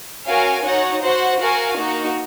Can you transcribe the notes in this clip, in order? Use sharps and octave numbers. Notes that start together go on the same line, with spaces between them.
C#4 F#4 A#4 F5 G#5
D#4 F#4 C#5 F#5
F#4 C5 F#5
F#4 A#4 F5 G#5
A#3 D#4 F#4